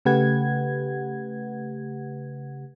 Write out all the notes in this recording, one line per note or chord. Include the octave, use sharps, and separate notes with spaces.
C#3 A3 G4 B4 F#5 G#6